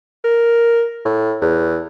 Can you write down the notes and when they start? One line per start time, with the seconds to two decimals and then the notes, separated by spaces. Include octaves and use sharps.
0.24 A#4
1.05 A2
1.41 E2